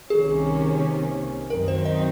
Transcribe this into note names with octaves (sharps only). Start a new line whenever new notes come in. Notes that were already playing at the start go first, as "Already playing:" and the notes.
C2 C3 D#3 A#3 C#4 G#4
F#2 D#3 F#3 C4 D#4 A#4
C5
D#5